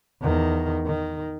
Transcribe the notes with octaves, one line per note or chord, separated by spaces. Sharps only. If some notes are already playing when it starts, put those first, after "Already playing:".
E2 D#3
D#3